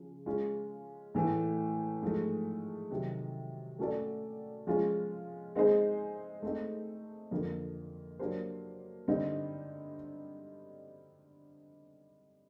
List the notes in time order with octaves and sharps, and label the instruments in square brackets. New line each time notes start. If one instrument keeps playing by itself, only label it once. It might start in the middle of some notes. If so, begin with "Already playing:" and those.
Already playing: [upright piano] C#3 F3
G#3 C#4 F4
A2 E3 A3
G#2 F3 A3
C3 D#3 F#3
A3 C#4 F#4 A4 D5
F3 G#3 C#4 F4
G#3 C4 D#4 G#4 C5
A3 C4 D#4
F2 D3 F3 A#3
F#3 A#3 D4 G4 C5
G2 D3 G3 C4 D#4